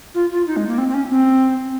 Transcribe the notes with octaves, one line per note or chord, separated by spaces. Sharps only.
F4
F4
D#4
G#3
A#3
C4
C4
C#4
C4